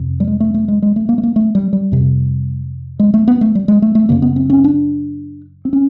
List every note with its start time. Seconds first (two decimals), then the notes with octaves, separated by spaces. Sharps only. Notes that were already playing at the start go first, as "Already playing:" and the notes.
Already playing: F2 C3
0.20 G3
0.27 G#3
0.40 A3
0.54 A3
0.68 G#3
0.82 G#3
0.96 A3
1.09 A#3
1.18 A3
1.23 A#3
1.36 A3
1.55 G3
1.73 G3
1.92 F2 C3
3.00 G#3
3.14 A3
3.28 B3
3.41 A3
3.55 G3
3.68 G#3
3.82 A3
3.95 A3
4.09 F#2 C#3 A#3
4.22 B3
4.36 C4
4.50 C#4
4.64 D4
5.65 C4
5.73 C#4